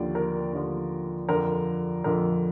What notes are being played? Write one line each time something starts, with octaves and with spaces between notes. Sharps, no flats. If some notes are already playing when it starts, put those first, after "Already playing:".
Already playing: D#2 D3 F3 D5
A#4
D#2 D3 F3
F2 D3 F3 A#4
F2 D3 F3 A#4